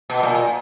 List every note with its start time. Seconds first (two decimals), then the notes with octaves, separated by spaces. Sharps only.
0.10 B2
0.23 A#2